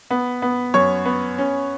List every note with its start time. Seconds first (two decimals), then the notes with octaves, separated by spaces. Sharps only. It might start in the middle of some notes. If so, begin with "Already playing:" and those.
0.11 B3
0.42 B3
0.74 F#2 C#5
1.05 B3
1.38 C#4